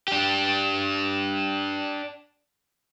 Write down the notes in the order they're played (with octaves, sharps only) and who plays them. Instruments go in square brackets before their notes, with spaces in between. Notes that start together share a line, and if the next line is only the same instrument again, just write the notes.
[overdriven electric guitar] D4 G4